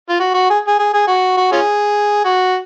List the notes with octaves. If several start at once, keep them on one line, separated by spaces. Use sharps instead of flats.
F4
F#4
F#4
G#4
G#4
G#4
G#4
F#4
F#4
C#4 F4 G#4
F#4